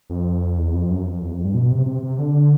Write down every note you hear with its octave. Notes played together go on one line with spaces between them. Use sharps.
F2
E2
F2
F#2
F2
E2
F2
G2
B2
C3
C3
C3
D3